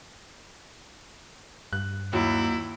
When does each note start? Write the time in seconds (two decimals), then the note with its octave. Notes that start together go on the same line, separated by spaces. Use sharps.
1.73 G2 F#6
2.13 D#2 F#3 E4